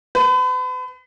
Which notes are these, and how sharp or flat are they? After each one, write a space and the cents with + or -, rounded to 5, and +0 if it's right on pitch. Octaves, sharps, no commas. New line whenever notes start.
B4 +40